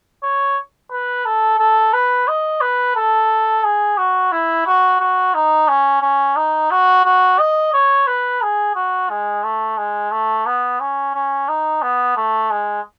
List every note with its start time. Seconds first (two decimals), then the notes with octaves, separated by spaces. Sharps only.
0.23 C#5
0.91 B4
1.25 A4
1.59 A4
1.93 B4
2.28 D#5
2.61 B4
2.96 A4
3.64 G#4
3.97 F#4
4.32 E4
4.66 F#4
5.00 F#4
5.34 D#4
5.68 C#4
6.02 C#4
6.36 D#4
6.71 F#4
7.05 F#4
7.39 D#5
7.73 C#5
8.07 B4
8.42 G#4
8.75 F#4
9.10 G#3
9.44 A3
9.78 G#3
10.12 A3
10.46 B3
10.80 C#4
11.15 C#4
11.48 D#4
11.82 B3
12.17 A3
12.51 G#3